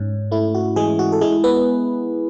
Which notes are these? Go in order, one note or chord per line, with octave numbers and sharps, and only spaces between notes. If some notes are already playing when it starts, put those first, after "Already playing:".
Already playing: G#2 C#4
A3 E4
F#4
E3 G#3 G#4
F#4
A4
G#3 E4 G#4
B3 B4